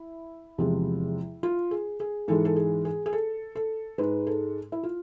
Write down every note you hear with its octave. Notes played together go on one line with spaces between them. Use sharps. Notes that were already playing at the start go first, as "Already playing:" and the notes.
Already playing: E4
E2 C3 F3 G#3
F4
G#4
G#4
G#2 E3 G#3 A4
A4
G#4
G#4
G#4
A4
A4
G#2 G#3 B4
A4
E4
F4